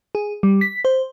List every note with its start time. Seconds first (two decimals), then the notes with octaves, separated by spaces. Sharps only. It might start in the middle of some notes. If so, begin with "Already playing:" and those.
0.15 G#4
0.43 G3
0.61 B6
0.85 C5